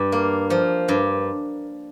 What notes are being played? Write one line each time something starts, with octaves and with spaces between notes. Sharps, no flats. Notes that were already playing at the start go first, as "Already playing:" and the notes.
Already playing: G2
A#3
F3
G2